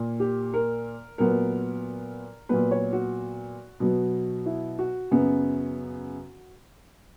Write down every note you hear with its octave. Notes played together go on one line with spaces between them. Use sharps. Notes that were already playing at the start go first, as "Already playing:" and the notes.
Already playing: A#2 A#3
G4
A#4
A#2 F#3 B3 A#4
A#2 F#3 B3 B4
C#5
F#4
B2 F#3 B3
E4
F#4
F#2 C#3 F#3 B3